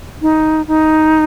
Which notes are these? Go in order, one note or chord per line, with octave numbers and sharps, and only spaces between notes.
D#4
D#4